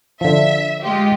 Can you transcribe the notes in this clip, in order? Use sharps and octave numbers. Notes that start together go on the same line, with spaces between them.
D3 F3 E5
G#3 F4 G4